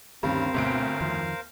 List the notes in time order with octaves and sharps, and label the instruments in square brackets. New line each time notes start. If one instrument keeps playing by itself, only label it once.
[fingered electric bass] D2 D#3 C#4 [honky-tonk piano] G2 [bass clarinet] C4 [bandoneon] A#4 C5 F5
[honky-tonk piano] G1 D2 D7 [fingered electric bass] B2
[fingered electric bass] F2 D#3 F3